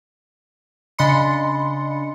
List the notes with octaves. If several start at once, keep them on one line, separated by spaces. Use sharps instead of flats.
C#3 D4 D#5 B5 C6 C#7